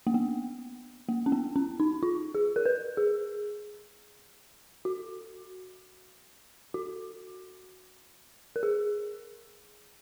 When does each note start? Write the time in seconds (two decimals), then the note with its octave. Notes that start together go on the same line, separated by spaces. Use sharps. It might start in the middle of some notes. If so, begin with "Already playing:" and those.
0.07 A#3
0.14 B3
1.09 A#3
1.26 C#4
1.32 B3
1.56 C#4
1.80 D#4
2.03 F4
2.35 G#4
2.56 A#4
2.66 B4
2.97 G#4
4.85 F#4
6.74 F#4
8.56 A#4
8.63 G#4